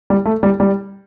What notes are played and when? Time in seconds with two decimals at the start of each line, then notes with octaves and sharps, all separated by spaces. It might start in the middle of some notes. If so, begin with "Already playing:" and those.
0.10 G3
0.25 A3
0.43 G3
0.60 G3